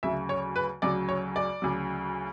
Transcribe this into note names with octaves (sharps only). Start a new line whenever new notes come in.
D2 C#3 F#3 E5
C#5
B4
D2 C#3 F#3 D5
C#5
D5
D2 C#3 F#3